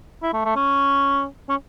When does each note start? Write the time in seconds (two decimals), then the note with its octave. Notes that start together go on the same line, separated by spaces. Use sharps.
0.23 E4
0.33 A3
0.45 A3
0.56 C#4
1.49 C#4